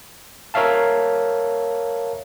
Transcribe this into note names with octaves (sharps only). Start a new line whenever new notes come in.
A#4 C#5 E5 F5 A5